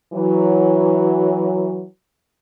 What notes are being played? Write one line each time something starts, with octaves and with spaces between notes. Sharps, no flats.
E3 F#3